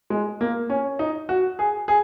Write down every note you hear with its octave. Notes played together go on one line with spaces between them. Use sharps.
G#3
A#3
C#4
D#4
F#4
G#4
G#4